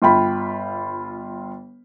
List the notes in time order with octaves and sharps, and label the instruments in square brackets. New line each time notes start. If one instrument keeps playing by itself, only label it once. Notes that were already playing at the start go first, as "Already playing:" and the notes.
[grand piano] G1 F4 G5 B5